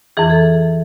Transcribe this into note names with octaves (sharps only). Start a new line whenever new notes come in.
F2 E3 G#4
A4